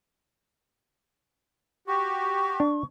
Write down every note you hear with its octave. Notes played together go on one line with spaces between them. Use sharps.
F#4 G4 C#6
D4